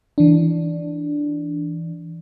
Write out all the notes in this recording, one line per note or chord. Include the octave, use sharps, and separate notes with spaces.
E3 D4